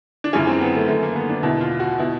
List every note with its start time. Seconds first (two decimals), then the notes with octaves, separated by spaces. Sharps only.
0.24 D4
0.33 F#2 C#3 E3 C#4
0.47 C4
0.61 B3
0.75 A3
0.88 F#2 D#3 A3
1.03 A#3
1.16 B3
1.29 D4
1.43 E2 B2 E4
1.61 F4
1.80 F#4
1.98 B2 E4